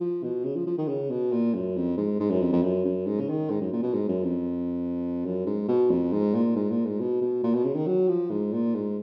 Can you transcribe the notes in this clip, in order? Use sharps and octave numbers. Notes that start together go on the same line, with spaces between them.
F3
B2
C#3
F3
F3
D#3
C#3
B2
A#2
F#2
F2
G#2
G#2
F#2
F2
F2
F#2
F#2
G#2
C#3
D#3
G#2
F#2
A#2
B2
G#2
F#2
F2
F#2
G#2
B2
F2
G#2
A#2
G#2
A#2
G#2
B2
B2
A#2
B2
C#3
D#3
F#3
F3
G#2
A#2
G#2